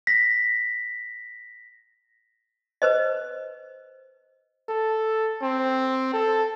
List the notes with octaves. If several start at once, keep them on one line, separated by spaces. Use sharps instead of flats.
A#6 B6
B4 C5 D#5
A4
C4
A4